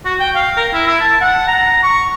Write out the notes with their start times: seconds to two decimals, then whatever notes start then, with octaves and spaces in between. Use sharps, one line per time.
0.05 F#4
0.19 G5
0.35 F5
0.57 A#4
0.73 E4
0.87 E4
1.01 A5
1.21 F#5
1.47 A#5
1.83 C#6